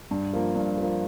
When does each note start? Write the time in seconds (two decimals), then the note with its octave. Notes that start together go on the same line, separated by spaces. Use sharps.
0.11 G2
0.33 F3 A#3
0.55 G2
0.78 F3 A#3